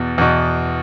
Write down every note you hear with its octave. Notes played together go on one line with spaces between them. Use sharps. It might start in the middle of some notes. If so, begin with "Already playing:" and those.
Already playing: E2 B2
E2 B2